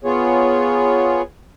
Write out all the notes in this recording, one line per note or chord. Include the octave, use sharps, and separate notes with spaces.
B3 F4 G#4 C#5